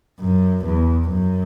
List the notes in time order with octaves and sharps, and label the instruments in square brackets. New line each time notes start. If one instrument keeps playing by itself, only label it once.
[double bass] F#2
E2
F#2